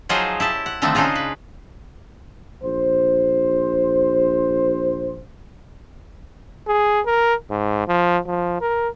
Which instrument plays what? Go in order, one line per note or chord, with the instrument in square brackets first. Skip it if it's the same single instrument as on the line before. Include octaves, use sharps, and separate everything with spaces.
[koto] F3 F#3 D#4 F4 G#4 C5
E4 G4 A5
F#5
D3 D#3 F3 A3 C4
C#3 D4 D#4 F4 G#4
B4
[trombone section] A#1 C5
[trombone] G#4
A#4
G#2
F3
F3
A#4